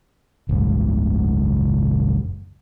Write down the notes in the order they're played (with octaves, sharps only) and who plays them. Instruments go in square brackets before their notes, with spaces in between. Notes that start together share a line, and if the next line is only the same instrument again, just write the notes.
[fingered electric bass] F#1 C#2 G#2